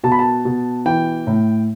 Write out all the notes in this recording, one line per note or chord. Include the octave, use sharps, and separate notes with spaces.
B2 A5
B5
A5
B2
E3 G5
A2